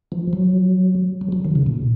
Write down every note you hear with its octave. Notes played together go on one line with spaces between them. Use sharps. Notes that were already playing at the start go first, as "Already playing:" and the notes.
F3
F#3
F#3
F#3
D#3
C#3
A#2